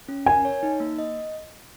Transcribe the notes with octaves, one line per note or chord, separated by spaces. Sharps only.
C#4
A#4 G#5
C#5
D#4
A#3
D#5